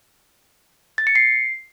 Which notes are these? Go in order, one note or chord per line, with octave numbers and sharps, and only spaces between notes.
A6
C#7
C7